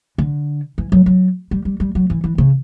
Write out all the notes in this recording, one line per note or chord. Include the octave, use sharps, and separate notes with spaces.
D3
E3
F#3
F#3
G3
G3
G3
F#3
E3
E3
C#3